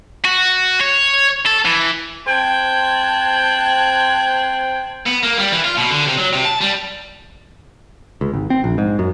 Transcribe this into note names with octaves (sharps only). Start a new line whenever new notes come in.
F#4
C#5
A4
E3
C4 C5 G5 A5 F#6 G#6
B3
A#3
G3
E3
F4
B2
D3
C3
F#3
C3
A5
G3
C#2
G#1
C4
A#1
G#2
F#2